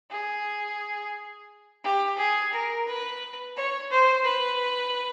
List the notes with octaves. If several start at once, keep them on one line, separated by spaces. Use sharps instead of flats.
G#4
G4
G#4
A#4
B4
C#5
C5
B4